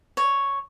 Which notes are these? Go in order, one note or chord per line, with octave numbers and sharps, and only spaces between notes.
C#5